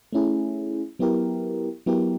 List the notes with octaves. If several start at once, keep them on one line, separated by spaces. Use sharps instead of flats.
A3 C#4 E4 G#4
F#3 B3 E4 G4 A#4
F#3 B3 E4 G4 A#4